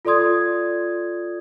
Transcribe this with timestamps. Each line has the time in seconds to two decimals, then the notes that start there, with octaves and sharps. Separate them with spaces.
0.05 F4 A4 D5 C6 D#6 G#6